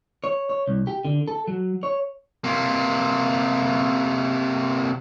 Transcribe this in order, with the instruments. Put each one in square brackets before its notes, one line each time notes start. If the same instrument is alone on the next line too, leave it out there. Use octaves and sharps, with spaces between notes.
[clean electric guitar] C#5
C#5
C2
G4
D3
A4
F#3
C#5
[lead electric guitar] C3 A#3